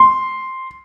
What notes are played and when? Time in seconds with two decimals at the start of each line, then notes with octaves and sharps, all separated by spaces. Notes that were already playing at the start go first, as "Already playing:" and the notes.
Already playing: C6